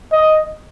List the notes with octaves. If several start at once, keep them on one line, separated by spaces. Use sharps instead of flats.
D#5